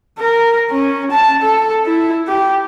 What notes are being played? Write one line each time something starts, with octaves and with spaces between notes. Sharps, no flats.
A#4
C#4
A5
A4
E4
G4